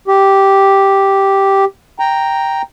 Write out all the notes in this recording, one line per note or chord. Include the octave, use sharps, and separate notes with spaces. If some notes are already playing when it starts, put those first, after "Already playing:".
G4
G5 A#5